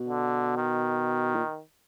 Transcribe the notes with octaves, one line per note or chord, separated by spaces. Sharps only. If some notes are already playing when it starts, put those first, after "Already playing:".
Already playing: B2
D3
D#3
A#2